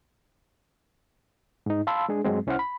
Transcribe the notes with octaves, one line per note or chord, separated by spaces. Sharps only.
G#2 D#4
F5 A5 B5 C6 E6
G#3 D4 G#4
G2 F#3 G#3 C4
C2 C#4 E4 C5 F#5 F6
B5